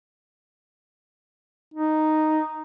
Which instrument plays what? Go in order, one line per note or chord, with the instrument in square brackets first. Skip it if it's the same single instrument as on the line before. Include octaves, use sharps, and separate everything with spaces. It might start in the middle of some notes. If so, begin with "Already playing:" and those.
[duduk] D#4